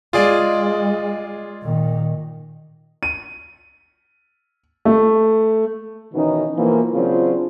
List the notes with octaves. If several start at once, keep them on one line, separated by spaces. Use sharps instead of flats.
G#3 F4 G#4 D5
A#2 D#3
D#7
A3
B2 D#3 E3 C#4 D#4
B2 E3 F3 A#3
C#3 F#3 C4 D4 F4 C5